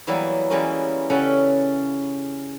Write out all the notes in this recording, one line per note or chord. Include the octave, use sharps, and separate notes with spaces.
E3 F#3 G3 A#3 B3 E4
E3 G3 G#3 A#3 B3 C#4
C#3 C#4 A4 B4 C#5 F#5